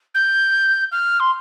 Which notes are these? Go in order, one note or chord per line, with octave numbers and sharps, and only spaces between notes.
G6
F6
C6